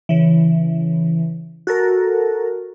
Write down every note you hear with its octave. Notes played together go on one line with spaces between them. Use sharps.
C#3 E3
F#4 A4 A#4